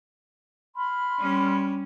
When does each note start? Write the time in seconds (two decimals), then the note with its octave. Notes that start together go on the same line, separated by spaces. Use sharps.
0.76 B5 C6 F6
1.18 G3 C#4